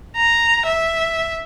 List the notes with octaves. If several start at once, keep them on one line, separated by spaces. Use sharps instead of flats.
A#5
E5